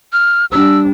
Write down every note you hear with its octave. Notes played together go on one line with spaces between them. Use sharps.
F6
G3 D4 E6